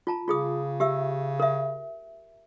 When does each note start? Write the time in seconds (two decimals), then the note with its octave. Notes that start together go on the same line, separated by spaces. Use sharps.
0.07 F4 A5 A#5
0.28 C#3 F4 G#4 D#6
0.80 G4 E5 E6
1.40 A#4 E5